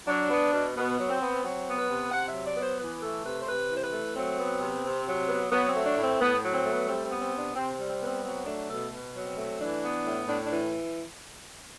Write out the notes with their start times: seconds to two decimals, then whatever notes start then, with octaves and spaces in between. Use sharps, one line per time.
0.07 F#3 D4
0.30 B3
0.52 B2
0.76 B2 B3
0.98 F#3
1.09 C4
1.21 B3
1.43 F#3 C4
1.67 B3
1.78 B4
1.90 C3
2.11 C3 F#5
2.28 E5
2.34 F#3
2.46 D5
2.57 B3
2.63 C5
2.80 E3 B4
3.02 A3 A4
3.25 C3 B4
3.41 C5
3.48 C3 B4
3.70 E3
3.76 C5
3.82 B4
3.93 A3
4.16 F#3 C4
4.39 B3
4.61 C3
4.84 C3
5.07 F#3
5.29 B3
5.52 F#3 B3
5.69 C4
5.74 A3
5.86 D4
5.97 A2
6.03 C4
6.20 A2 B3
6.42 F#3
6.54 C4
6.65 A3
6.71 B3
6.88 G3 C4
7.05 C4
7.10 B3
7.22 C4
7.33 C3
7.39 D4
7.55 C3 C4
7.73 C4
7.78 G3
7.90 C4
8.01 B3
8.06 C4
8.24 F#3 C4
8.46 A3 D4
8.69 B2 A4
8.92 B2
9.14 F#3
9.26 C4
9.38 A3
9.60 E3 D4
9.83 B3
10.05 A2
10.28 A2 D4
10.45 D4
10.51 E3